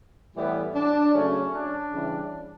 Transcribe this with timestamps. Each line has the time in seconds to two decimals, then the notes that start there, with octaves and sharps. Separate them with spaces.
0.35 A2 E3 G3 B3
0.75 D4
1.14 C#3 F#3 A3 C#4
1.52 D4
1.92 C#3 E3 G3